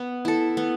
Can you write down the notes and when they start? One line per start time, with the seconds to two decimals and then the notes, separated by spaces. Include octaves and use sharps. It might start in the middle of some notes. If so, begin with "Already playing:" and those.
Already playing: B3
0.25 E4 A4
0.57 B3